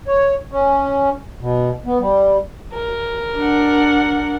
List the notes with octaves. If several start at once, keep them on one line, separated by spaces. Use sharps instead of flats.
C#5
C#4
B2
B3
G3
A#4
D4 F#5